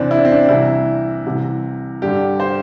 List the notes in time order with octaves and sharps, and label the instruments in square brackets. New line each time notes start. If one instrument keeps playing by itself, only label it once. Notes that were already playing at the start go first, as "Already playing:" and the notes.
Already playing: [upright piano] E2 C3 E3 C4 D4
E4
D4
C4
D4
C2 C3 E3 E4
C2 C3 E3
G2 D3 G4
C5